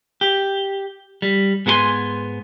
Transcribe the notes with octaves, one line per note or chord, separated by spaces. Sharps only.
G4
G3
G#2 B3 F#4 A4 G#5 C6